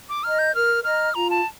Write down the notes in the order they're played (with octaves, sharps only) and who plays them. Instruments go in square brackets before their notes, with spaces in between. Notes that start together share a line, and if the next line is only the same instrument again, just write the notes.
[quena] D6
[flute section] D#5 A#5 [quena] F6
[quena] G6
[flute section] A#4 [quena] F6
[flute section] D#5 A#5 [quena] F6
[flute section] F4 [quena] A#5
[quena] A5